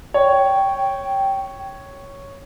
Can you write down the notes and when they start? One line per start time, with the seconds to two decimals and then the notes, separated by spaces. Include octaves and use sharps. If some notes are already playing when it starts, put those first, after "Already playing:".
0.14 C#5 G5